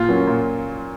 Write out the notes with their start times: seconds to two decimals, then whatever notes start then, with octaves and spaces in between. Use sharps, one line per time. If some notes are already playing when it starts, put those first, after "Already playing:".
Already playing: A#2 F4
0.09 F#3 A#3 C#4
0.27 A#2